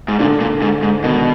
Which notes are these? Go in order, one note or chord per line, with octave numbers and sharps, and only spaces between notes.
G#2
A#2 D3 D4
A#2
G#2
G#2
B2 D#3 D#4